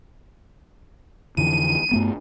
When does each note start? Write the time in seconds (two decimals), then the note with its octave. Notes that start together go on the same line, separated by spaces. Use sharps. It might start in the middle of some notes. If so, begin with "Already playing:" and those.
1.37 F2 D3 E3 D#7
1.91 G2 A3 B3